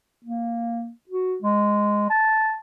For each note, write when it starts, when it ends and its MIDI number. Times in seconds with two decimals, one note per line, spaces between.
0.24 0.90 58
1.09 1.36 66
1.42 2.10 56
2.10 2.57 81